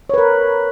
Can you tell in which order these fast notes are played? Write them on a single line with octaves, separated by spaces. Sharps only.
C#5 B4 A#4